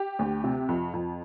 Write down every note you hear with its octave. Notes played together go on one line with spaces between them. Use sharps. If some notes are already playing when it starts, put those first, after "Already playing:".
Already playing: G4
D2
C3
F2
F2